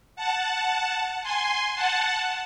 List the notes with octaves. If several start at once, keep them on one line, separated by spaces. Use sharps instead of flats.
F#5 A5
G#5 C6
F#5 A5